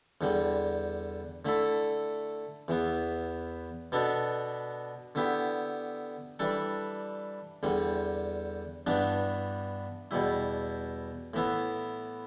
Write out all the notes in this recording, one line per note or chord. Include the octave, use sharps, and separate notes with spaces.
E2 D3 G3
D3 A3 E4 A4
E2 E3 B3
B2 B3 D4 A4
D3 B3 E4 G4
E3 G3 D4 A4
E2 D3 G3
G2 E3 B3 D4
E2 B2 G3 E4
A2 E3 B3 E4